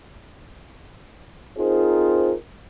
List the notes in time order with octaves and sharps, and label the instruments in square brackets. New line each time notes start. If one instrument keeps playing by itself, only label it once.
[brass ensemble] C4 D#4 F4 G#4 A#4 C5